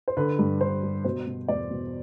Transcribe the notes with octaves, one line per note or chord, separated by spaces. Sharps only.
C5
D3 B4
G2
D3 C5
G2
B2 C5
B2
E2 D5
B2